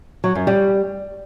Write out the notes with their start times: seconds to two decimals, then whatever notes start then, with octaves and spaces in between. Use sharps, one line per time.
0.24 F#3
0.35 F#2
0.47 G3